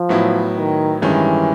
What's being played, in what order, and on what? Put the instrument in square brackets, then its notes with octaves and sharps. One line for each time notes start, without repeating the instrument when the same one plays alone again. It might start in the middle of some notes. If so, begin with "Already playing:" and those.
Already playing: [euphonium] F3
[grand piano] A2 F#3 B3 E4
[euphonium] D#3
[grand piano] G2 D#3 G#3 C#4 [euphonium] E3